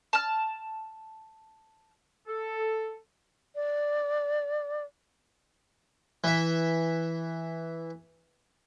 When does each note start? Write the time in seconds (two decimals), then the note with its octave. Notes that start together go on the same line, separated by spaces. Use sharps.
0.13 A5 F6
2.28 A4
3.55 D5
6.24 E3 E5